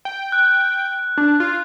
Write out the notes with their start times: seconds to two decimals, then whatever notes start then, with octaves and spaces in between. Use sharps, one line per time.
0.05 G5
0.32 F#6
1.18 D4
1.40 F4